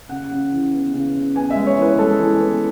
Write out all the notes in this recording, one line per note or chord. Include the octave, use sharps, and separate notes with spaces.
C#3 F#5
C#3
E3
B3
C#3
C#3
B3 G#5
E5
G#3
C#5
E3 B4
G#3 A4
E3
B3